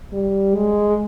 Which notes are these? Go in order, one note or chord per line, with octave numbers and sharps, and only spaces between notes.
G3
G#3